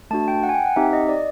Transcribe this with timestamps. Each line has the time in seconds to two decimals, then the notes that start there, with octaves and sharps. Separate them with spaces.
0.11 A3 D4 F#4 A5
0.28 G5
0.43 F#5
0.49 G#5
0.55 G5
0.66 F#5
0.76 C4 D#4 G4 E5
0.93 D#5
1.09 D5